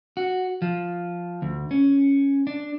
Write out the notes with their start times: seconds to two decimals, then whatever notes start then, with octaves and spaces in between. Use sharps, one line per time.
0.17 F#4
0.62 F3
1.42 D2
1.71 C#4
2.47 D4